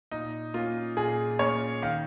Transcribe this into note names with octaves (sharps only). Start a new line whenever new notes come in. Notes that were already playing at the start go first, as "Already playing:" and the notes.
A#2 D#4
A#3 C#4 F4
A#2 G#4
A#3 C#4 C#5
D#3 F5